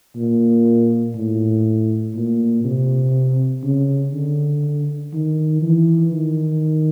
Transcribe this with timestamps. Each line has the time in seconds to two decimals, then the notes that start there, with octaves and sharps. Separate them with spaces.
0.16 A#2
1.15 A2
2.15 A#2
2.64 C3
3.64 C#3
4.13 D3
5.13 D#3
5.63 E3
6.12 D#3